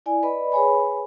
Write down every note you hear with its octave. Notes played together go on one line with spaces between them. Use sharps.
E4 D5 G#5
B4 D5 D#5 B5
G#4 B4 C#5 G#5 B5